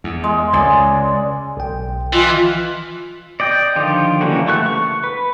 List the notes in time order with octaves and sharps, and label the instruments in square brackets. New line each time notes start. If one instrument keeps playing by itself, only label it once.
[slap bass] E2
[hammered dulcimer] G#3
[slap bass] C#2 [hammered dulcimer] G#4 D5 G#5
[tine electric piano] B1 G5
[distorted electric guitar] E3 [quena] F4 [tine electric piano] D#5 G#5 C6
[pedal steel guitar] D5 D#5 G5
D3 D#3 F3 F4 G4
C#3 E3 G3 A#3 F#4
A3 C#6 F#6
C#6
B4